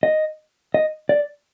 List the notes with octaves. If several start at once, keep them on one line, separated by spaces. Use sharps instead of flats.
D#5
D#5
D5